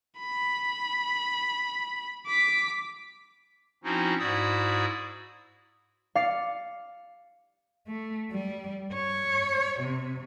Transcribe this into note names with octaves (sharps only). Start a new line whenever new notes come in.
B5
D6 B6
F3 C4 C#4 D#4 E4 F#4
G#2 E4 F#4 D5 D#6 E6
F5 D6 A6 C#7
A3
G3
C#5
C3